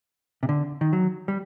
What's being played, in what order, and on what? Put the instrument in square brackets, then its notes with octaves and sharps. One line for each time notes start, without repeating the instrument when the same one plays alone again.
[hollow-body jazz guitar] C3
D3
D#3
F#3
G3